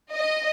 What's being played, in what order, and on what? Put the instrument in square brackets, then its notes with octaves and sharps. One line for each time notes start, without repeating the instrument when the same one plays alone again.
[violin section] D#5